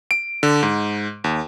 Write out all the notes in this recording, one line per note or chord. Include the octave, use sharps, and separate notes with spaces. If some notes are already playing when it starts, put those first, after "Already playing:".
D7
D3
G#2
D#2